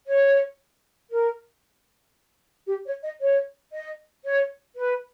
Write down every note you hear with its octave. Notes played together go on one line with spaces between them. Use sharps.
C#5
A#4
G4
C#5
D#5
C#5
D#5
C#5
B4